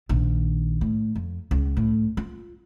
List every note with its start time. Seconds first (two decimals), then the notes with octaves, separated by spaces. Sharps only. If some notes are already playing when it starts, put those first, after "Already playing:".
0.09 A#1 D#3
0.81 A2
1.15 F2
1.51 C#2
1.77 A2
2.17 F4